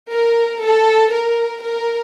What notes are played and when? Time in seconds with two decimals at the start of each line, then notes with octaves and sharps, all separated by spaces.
0.12 A#4
0.63 A4
1.12 A#4
1.63 A#4